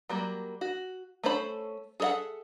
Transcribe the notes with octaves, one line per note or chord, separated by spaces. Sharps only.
F#3 G3 A#3
F#4
A3 C#4 A4 C5 B5
G#4 A4 C5 E5 F#5